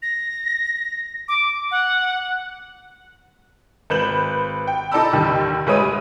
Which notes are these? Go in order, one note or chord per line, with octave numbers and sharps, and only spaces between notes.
A#6
D6
F#5
G#1 B4 G6 E7 F#7
G5
D#4 A4 D5 A5 B5 E6
D#2 D3 D#3 G3
D2 G#3 B4 C#5 D#6 D#7
G3